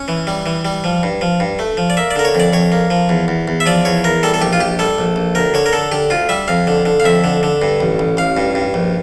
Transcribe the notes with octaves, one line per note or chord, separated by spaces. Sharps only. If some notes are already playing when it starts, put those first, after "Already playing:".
Already playing: C#4
E3
G3
E3
G3
F3
G2
F3
G2
A3
F3
D5
A#3 E5
D5
D3 A#4
C#5
F2 D5
F2 C#5
A#3
F3
E2
E2
E2
E5
F3 D5
E2 C#5
E2 A#4
G3 A4
A4
A#1 G4
F4
A#1 G4
G3 A4
A#1
A#1
D2 A#4
D3 C#5
A#4
D3 A4
D3 G4
D2 F4
G3 E5
F2 F5
D3
D3
F5
F2 E5
D3
D3
G2
A1
A1
A1 F5
G2
G2
A#1